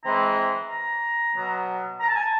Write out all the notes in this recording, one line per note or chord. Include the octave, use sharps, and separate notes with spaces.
E3 G#3 C4 E4 A#5
A#5
B2 F#3 B3
A#5
A5
G#5
A5